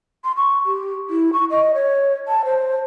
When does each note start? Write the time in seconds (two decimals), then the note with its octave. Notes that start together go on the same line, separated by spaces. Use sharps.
0.24 C6
0.37 C#6
0.66 G4
1.10 E4
1.33 C#6
1.50 D#5
1.74 C#5
2.28 A5
2.45 C5